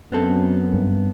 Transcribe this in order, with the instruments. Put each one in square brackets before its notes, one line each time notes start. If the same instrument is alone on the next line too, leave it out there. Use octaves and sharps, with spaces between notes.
[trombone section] F#2 [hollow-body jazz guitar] B3 C4 A4
[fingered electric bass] G2